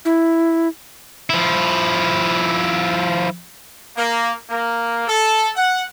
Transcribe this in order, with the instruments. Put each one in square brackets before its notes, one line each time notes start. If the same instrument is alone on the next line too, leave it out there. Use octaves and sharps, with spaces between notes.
[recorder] E4
[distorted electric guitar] F3 E4
[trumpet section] A#3
A#3
A4
F#5